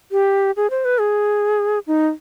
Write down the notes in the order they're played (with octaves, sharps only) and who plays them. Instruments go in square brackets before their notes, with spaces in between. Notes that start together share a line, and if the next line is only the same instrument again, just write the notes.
[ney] G4
G#4
C5
B4
G#4
D#4